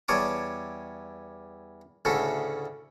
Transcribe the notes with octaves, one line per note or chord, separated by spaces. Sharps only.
E2 G3 C#5 A5 D6 D#6
D2 A2 C#3 F#4 A4